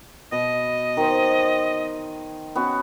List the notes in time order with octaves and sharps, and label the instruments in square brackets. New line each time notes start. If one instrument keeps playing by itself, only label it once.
[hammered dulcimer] B2 [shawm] D#5
[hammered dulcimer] D#3 C5
B3 C#4 F#4